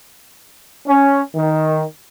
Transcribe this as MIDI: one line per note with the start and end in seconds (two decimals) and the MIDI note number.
0.86 1.20 61
1.35 1.84 51